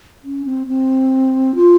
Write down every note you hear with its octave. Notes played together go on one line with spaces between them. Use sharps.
C#4
C4
C4
F4